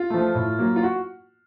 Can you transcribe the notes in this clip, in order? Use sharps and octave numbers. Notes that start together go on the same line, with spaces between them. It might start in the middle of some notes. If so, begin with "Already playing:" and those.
Already playing: F4
F3 A3
A2
F#3 A#3
F4
F#4